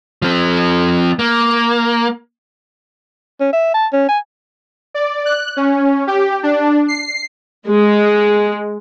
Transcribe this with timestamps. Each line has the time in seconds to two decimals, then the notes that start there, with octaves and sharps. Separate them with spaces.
0.22 F3 C4
1.19 A#3
3.40 C#4
3.53 E5
3.74 A5
3.92 C#4
4.08 G#5
4.94 D5
5.25 F#6
5.57 C#4
6.07 G4
6.43 D4
6.88 C7
7.68 G#3